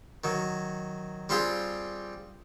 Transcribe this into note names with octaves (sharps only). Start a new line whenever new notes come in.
D#3 F#3
G3 C4 F4 G4 G#4